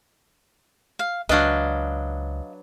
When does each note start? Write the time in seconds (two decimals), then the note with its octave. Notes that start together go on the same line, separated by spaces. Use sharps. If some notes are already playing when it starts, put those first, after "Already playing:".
0.99 F5
1.29 C#2 F#3 D4 B4 D#5 F5